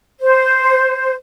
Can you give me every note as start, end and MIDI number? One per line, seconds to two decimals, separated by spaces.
0.20 1.14 72